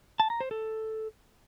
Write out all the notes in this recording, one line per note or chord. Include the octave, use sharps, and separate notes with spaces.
A5
A#5
C5
A4